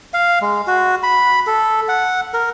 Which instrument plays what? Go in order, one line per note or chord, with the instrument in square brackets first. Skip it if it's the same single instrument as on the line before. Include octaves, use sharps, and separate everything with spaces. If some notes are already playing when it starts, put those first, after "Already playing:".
[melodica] F5
G#3
F#4
B5
A4
F#5
A#4